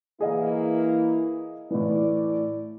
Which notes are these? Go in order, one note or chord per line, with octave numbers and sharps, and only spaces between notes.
E3 A#3 E4 G#4 D#5 F5
A2 E3 D5